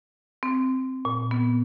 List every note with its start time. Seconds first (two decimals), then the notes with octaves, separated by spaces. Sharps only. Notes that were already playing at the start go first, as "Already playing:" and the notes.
0.43 C4
1.05 A#2
1.31 B3